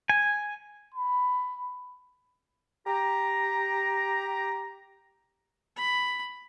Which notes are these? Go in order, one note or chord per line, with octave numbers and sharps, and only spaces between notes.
G#5
B5
G4 A#5
B5